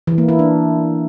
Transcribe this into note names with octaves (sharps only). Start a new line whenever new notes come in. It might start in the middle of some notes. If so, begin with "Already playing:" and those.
E3
A#3
E4
D4